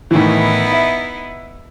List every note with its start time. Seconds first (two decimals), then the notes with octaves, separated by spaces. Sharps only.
0.11 A2 D#3 E3 B3 D#4 E4
0.73 E5